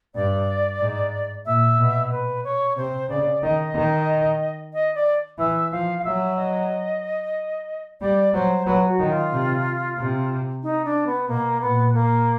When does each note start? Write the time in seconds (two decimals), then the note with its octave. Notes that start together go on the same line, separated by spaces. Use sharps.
0.15 G2 D5
0.81 G#2
1.46 A#2 E5
1.78 B2
2.11 B4
2.44 C#5
2.76 C3 C5
3.09 C#3 D5
3.42 D#3 D#5
3.75 D#3
4.74 D#5
4.95 D5
5.38 E3 E5
5.72 F3 F5
5.99 F5
6.04 F#3 E5
6.37 D#5
8.01 G3 D5
8.33 F#3 C5
8.66 F#3 B4
8.88 F#4
9.00 D#3
9.10 F4
9.32 C3
9.98 C3
10.63 D#4
10.85 D4
11.06 B3
11.28 B2 A#3
11.61 A#2 B3
11.94 A#3